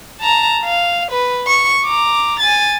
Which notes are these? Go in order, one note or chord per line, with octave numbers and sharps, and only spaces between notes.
A5 A#5
F5
B4
C#6
A#5 D6
G#5 A6